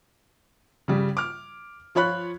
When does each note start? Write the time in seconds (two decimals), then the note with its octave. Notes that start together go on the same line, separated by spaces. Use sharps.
0.88 C#3 G3
1.17 D6 F6
1.95 F3 F4 C#5 B5 F#6